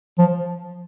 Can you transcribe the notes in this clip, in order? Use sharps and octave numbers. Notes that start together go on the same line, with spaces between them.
F3